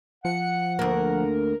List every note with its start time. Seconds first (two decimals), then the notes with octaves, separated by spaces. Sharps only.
0.25 F3 F#5 C#7
0.79 D2 A#3 A#4